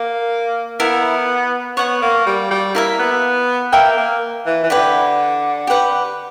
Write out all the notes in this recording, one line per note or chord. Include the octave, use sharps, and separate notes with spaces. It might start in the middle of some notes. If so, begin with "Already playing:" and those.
Already playing: A#3
B3 E4 A#4 E5
B3 C#5 F#5 C#6
A#3
G3
G3
A#3 E4 A#4 E5
B3
A#3 A#4 E5 G5
A#3
E3
E3
D3 E4 G4 B4
G4 B4 F#5